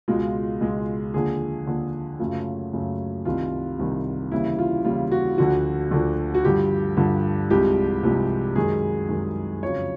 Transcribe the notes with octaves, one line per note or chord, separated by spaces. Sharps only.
C#2 B2 G#3 F4
C#2 B2 G#3
D#2 D3 F3 G#4
D#2 D3 F3
F#2 C#3 F#3 A3 F4
F#2 C#3 F#3 A3
C2 C3 D#3 G3 F4
C2 C3 D#3 G3
D#2 C#3 E3 G3 E4
F4
D#2 C#3 E3 G3 F4
F#4
D2 D3 F3 F#4
D2 D3 F3
F#4
G2 D3 F3 G4
G2 D3 F3
C2 C3 F3 G#3 G4
C2 C3 F3 G#3
F#2 D#3 G#3 G#4
F#2 D#3 G#3
F2 C#3 F#3 C#5